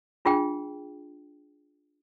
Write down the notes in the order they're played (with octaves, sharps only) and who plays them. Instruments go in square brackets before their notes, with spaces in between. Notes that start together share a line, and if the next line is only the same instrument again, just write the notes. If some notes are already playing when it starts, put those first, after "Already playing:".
[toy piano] D4 F4 G#4 G5